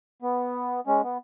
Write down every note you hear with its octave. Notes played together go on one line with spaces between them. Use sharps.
B3
G#3 C#4
B3